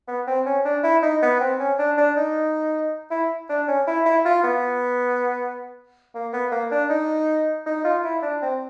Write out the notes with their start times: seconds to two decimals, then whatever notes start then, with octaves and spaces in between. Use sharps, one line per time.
0.08 B3
0.27 C4
0.46 C#4
0.65 D4
0.83 E4
1.03 D#4
1.22 B3
1.40 C4
1.60 C#4
1.79 D4
1.97 D4
2.17 D#4
3.11 E4
3.49 D4
3.68 C#4
3.87 E4
4.06 E4
4.25 F4
4.44 B3
6.15 A#3
6.33 B3
6.52 A#3
6.71 D4
6.90 D#4
7.66 D#4
7.84 F4
8.04 E4
8.22 D4
8.42 C4